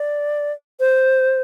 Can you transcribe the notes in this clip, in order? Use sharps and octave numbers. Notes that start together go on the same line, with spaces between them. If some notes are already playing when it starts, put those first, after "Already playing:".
Already playing: D5
C5